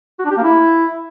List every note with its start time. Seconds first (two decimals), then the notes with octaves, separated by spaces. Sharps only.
0.19 F#4
0.25 D4
0.31 G4
0.37 A#3
0.43 E4